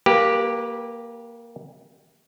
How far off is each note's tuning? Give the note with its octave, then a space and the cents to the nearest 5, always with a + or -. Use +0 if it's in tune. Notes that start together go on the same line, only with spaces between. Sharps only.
A#3 +0 G4 +0 B4 -30